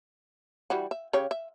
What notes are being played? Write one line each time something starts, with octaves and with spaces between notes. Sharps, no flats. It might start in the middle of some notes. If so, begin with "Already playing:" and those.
E3 G3 F#4
E5
C#3 G4 C#5
E5